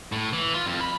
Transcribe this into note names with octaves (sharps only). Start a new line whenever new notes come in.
A2
E3
F4
F2
B5